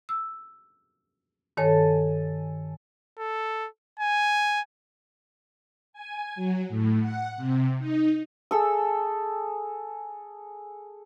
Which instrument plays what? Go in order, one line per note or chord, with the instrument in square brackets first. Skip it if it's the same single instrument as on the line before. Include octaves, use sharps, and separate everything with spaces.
[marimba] E6
[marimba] G2 D#3 C#5 [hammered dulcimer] A4 G#5 A5
[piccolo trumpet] A4
G#5
[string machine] G#5
F#3
A2
F#5
C3
D#4
[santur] G#4 A4 E6